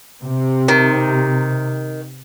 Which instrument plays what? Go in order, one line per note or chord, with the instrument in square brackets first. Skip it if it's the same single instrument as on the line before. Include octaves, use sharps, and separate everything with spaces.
[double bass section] C3
[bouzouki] D#3